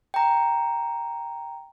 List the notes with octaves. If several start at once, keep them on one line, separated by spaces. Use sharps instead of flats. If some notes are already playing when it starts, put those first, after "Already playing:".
G5 A#5